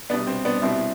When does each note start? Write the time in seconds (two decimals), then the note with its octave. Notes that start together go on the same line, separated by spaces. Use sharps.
0.10 C2 B2 G3 B3 D4
0.27 C4
0.45 B3 D4
0.62 C2 B2 G3 C4 E4